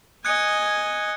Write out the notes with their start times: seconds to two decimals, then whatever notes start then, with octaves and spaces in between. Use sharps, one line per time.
0.25 D#5 G#5 F#6 G#6 C#7